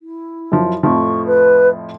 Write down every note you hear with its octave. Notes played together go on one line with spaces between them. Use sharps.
E4
F#2 F3
F2 A2 F3 C#6
B4